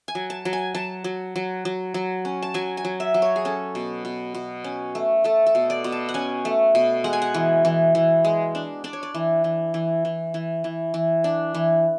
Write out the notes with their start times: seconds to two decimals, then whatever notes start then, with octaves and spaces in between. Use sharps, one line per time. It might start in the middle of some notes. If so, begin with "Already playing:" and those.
0.08 G#5
0.15 F#3
0.30 A5
0.45 F#3
0.53 G#5
0.75 F#3 A5
1.04 F#3
1.36 F#3
1.65 F#3
1.94 F#3
2.25 C#4
2.42 A5
2.54 F#3 G#5
2.77 G#5
2.85 F#3
3.00 E5
3.14 F#3
3.22 C#5
3.36 G#4
3.45 C#4 A4
3.75 B2
4.05 B2
4.35 B2
4.64 C#4
4.95 A3
5.24 A3 A4
5.47 A4
5.55 B2
5.70 D5
5.84 B2
5.92 A5
6.09 F#5
6.14 C#4 G#5
6.45 A3
6.75 B2
7.04 G#3 F#5
7.13 G#5
7.22 F#5
7.34 E3
7.65 E3
7.95 E3
8.25 G#3
8.55 D4
8.84 D4 D5
8.93 C#5
9.03 D5
9.14 E3
9.44 E3
9.74 E3
10.05 E3
10.34 E3
10.64 E3
10.94 E3
11.24 D4
11.54 E3